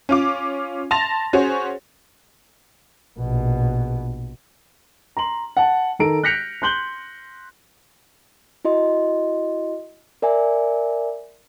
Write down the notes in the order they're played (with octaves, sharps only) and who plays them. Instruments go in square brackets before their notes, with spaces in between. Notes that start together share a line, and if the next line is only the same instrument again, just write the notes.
[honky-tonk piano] C#4 F4 D6
A5 C6 A6 A#6 F7
C#4 F#4 G#4 C5 C#5
[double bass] A#1 B2
[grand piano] A#5 C6 F#7
F#5 A5
D#3 A4 A#5 D7
F#6 G6 A#6 B6 C#7 F7
C6 F#6 G6 F#7 G7
[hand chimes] E4 F#4 D#5 C6
A#4 D5 E5 G#5